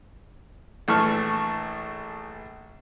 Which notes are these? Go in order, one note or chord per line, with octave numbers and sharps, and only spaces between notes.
A#1 E3 A3 C#6 F6